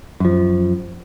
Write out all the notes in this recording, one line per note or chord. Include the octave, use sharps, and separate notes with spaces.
F#2 F3